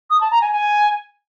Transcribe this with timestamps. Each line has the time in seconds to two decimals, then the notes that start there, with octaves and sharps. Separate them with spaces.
0.10 D#6
0.21 A5
0.31 A#5
0.42 G#5
0.52 G#5